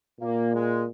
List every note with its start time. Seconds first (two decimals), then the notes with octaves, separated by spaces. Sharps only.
0.21 A#2 A#3
0.53 G#3